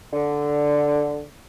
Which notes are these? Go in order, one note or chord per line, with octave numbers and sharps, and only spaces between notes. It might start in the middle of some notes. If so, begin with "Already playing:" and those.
D3